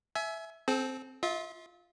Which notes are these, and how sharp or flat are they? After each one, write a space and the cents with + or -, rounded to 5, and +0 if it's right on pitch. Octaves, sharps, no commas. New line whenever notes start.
E5 +0 G#5 +30
C4 +0 A4 -40
F4 +5 E5 -40